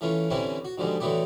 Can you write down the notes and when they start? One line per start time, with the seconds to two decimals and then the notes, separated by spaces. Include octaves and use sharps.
0.01 E3 A3 C#4 F4
0.30 D3 E3 G3 C4 C#4 E4
0.65 F#4
0.78 G#2 B2 D3 F3 G3 G#3
1.00 D3 E3 F#3 A3 B3 G4